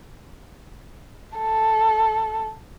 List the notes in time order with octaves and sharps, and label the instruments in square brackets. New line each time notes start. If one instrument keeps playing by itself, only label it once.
[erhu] A4